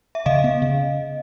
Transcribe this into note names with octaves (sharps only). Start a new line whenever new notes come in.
E5
C#3 D#5 F5
B3
C#3